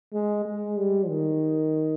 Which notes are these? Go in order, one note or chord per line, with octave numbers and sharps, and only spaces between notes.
G#3
G#3
G3
D#3